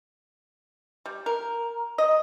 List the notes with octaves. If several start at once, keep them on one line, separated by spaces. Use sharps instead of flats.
G3
A#4
D#5